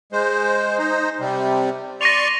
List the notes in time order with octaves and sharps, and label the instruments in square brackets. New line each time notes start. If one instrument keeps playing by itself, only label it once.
[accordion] G#3 C5
D#4 C5
C3 G3
[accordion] D5 C6 C#6 [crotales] A#6 D#7 F7